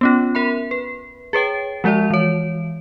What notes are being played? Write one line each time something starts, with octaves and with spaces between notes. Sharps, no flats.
B3 C#4 F4
A#4 E5 B5
B4
G#4 B4 C#5 G5
F3 G#3 F#4 D5 E5
E3 C#5